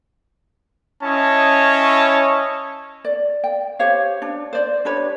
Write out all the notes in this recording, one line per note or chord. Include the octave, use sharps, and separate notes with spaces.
C#4 E4 C#5 D#5 A5
D5
G5
G4 C5 C#5 F5
D4
C5 D5
D4 G4 B4 C#5